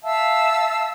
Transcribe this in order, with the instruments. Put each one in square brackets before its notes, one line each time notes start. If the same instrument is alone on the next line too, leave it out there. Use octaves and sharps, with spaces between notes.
[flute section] E5 F5 A5 E6